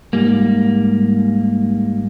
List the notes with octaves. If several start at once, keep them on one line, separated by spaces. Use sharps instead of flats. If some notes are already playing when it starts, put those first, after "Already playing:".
G#2 G3 A#3